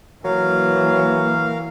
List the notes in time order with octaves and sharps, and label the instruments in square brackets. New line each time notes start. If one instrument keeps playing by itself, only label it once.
[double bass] E3 A#3 [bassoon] F#3 [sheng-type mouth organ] A#4 F5